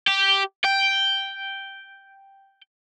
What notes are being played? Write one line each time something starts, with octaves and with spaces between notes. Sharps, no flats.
G4
G5